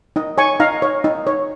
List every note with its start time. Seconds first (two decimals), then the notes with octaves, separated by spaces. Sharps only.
0.16 D#4 D#5
0.38 C#5 G#5 C#6
0.60 D#4 F5 A#5
0.82 C#5
1.04 D#4
1.27 C#5